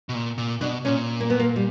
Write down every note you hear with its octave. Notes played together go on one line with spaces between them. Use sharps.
B2
A#2
A#2
B2 D4
A#2 C#4
A#3
B3
A#3
G3